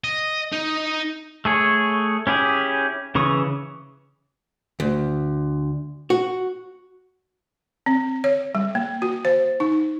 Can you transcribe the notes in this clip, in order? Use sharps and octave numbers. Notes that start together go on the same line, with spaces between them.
D#5
D#4
A3 G#4 C#5
C#4 E4 G4 G#4
C#3 E3 C#6 D#6
D2
F#4
C4
C#5
G3
A#3
F#4
C5
D#4